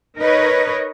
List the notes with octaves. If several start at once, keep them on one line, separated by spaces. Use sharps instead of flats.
D#4 A#4 B4 C#5 D#5